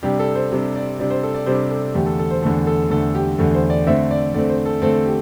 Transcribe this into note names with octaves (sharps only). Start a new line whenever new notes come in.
C3 G3 D4 G4
A4
C5
C3 G3 D4
D5
C3 G3 D4 D5
C5
A4
D5
C3 G3 D4 C5
A4
E2 D3 A3 G4
A4
A4
C5
E2 D3 A3 A4
A4
E2 D3 A3 A4
G4
E2 D3 A3 A4
C5
D5
D3 A3 C4 E5
D5
D3 A3 C4 D5
C5
A4
D3 A3 C4 A4
G4